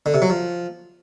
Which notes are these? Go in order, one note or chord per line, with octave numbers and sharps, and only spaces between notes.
D3
C3
F#3
F3